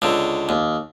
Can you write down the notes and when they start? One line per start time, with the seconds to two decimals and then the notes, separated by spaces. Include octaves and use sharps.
0.02 C#2 D3
0.49 D#2